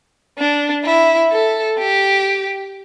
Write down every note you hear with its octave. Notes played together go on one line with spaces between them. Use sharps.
D4
E4
A4
G4